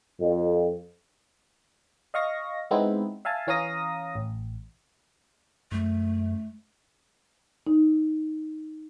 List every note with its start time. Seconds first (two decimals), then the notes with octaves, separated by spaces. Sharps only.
0.20 F2
2.14 D#5 F5 C#6 A#6
2.71 G#3 B3 C4 D#4 E4
3.25 E5 F5 G#5 A5
3.47 E3 C#4 F5 A#5 D#6 A#6
4.15 A1
5.72 F#2 A3
7.67 D#4